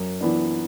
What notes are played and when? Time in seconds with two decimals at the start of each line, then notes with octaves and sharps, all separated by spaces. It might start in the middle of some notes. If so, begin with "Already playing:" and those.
Already playing: F#2
0.21 E3 B3 D4